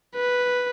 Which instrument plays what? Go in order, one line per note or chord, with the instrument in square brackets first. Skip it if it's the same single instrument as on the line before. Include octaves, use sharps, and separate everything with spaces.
[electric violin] B4